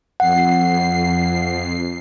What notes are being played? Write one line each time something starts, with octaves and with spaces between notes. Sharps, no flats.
F2 F#5 C7